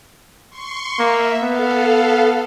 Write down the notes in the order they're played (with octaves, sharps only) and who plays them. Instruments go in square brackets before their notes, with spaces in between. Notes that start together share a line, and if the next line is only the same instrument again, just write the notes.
[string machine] C6 C#6
[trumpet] A#3 [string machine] E5
[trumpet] B3 [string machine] A4 F5